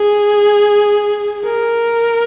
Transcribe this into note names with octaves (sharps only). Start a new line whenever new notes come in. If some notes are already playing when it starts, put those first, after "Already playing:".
Already playing: G#4
A#4